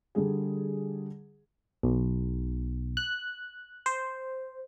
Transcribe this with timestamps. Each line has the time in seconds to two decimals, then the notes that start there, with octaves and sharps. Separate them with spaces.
0.15 D3 G3 G#4
1.83 B1
2.97 F#6
3.86 C5